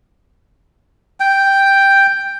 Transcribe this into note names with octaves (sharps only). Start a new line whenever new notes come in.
G5